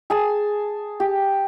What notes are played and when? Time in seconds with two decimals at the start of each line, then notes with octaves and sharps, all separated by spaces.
0.10 G#4 G#5 A5
1.00 G4